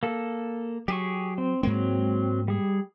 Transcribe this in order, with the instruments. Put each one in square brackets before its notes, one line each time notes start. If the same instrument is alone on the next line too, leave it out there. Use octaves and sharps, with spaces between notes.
[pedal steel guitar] A#3 A4
[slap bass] F#3 [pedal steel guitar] G4 G#4 C#6
[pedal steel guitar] C4
[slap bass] G#2 G#3 A#3 [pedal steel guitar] F#3 C4
[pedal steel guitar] G3 G#4